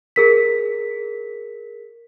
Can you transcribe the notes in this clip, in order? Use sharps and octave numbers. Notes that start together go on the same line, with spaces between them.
G#4 A#4 B6